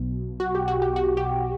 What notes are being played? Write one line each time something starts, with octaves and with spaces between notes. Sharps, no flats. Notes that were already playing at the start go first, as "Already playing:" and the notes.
Already playing: B1 B2
F#4
G4
F#4
G4
F#4
G4